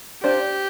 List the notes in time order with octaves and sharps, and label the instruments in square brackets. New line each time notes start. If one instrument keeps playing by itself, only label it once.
[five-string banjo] D4 F4 C5 [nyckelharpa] G4